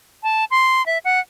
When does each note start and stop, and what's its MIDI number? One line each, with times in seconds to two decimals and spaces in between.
0.23 0.44 81
0.51 0.85 84
0.86 0.98 76
1.05 1.19 78